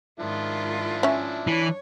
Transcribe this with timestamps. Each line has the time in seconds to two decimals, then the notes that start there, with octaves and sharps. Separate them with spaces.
0.19 G#2 D#3 F3 D4 E4 F4
1.03 C#4 E5
1.47 E3 C#5